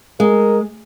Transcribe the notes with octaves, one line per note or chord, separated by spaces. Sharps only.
G#3 A#4